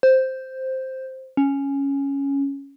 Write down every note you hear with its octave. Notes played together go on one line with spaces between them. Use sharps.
C5
C#4